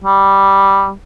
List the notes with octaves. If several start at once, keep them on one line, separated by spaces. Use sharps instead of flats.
G3